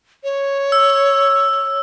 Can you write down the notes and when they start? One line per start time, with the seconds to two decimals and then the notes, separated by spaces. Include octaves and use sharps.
0.24 C#5
0.72 E6